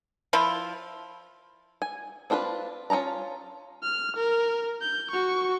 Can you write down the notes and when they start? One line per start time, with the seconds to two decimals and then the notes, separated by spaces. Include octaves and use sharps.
0.33 F3 E4 F4
1.82 G#5
2.30 C4 D4 F4 A#4 B4
2.90 C#4 F4 D5 A5 A#5
3.82 F6
4.17 A#4
4.81 G6
5.11 F#4 C#6